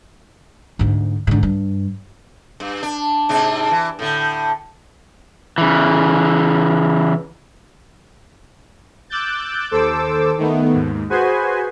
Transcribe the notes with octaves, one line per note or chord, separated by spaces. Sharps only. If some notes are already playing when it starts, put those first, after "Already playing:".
D2 G#2
G#2 D3
G2
G2
D4
G#2 C3 D4
E3
A2 D3
C#3 E3
D6 E6 F#6 G6 A6
D#2 A4 C5 D6 E6
D#3 A3 B3
D#2 G#2
F#4 G#4 B4 C5 G#5